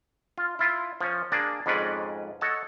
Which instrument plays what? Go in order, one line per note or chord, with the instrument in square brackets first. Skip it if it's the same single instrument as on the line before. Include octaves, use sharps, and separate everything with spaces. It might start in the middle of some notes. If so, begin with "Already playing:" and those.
[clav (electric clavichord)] F4
E4 F4
F3 C#4
A#3 D4 G#4 D5
F2 G#2 G#3 C#4 B4 D5
A4 C#5 D#5 F#5 A5